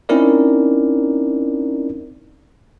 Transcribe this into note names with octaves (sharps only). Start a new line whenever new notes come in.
C4 C#4 D#4 E4 A#4 D5